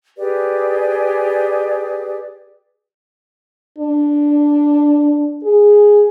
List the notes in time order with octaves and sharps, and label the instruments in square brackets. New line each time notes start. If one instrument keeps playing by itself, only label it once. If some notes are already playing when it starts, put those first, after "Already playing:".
[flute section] G4 G#4 B4 D5
[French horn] D4
G#4